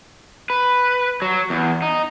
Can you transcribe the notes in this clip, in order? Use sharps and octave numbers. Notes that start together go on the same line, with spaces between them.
B4
F#3
E2
D#4